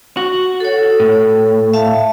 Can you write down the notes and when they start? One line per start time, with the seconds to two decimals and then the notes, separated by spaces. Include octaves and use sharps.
0.17 F#4
0.60 A4 C#5
1.00 A2
1.74 E5 F5 A5